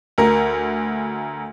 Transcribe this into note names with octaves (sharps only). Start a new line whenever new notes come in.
D2 A#4